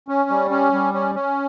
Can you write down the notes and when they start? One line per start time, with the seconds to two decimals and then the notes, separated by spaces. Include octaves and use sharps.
0.08 C#4
0.30 G3
0.50 C#4
0.73 G3
0.94 C#4
1.15 C#4